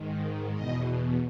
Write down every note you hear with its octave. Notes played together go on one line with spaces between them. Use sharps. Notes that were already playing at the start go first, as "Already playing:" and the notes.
Already playing: G#2 D#3
E2 B2 D#5